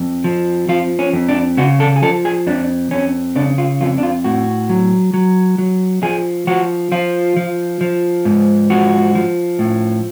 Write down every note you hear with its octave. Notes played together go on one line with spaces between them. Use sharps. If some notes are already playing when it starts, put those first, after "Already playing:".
Already playing: F2
F3
F3 F4
C#4
F2
D4
C#3 F#4
A4
G#4
F3 A4
G#4
F2 D4
F2 C#4
C#3 D4
F4
F2 F4
D4
F4
A2 F#4
F#3
F#3
F#3
F3 G#4
F3 F#4
F3 F4
F3
F3
G#2
F3 F#4
F3
A2